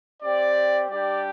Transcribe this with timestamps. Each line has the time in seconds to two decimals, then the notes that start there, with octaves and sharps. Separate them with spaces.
0.23 C4 G4 D5
0.91 G3 D4 G4 D5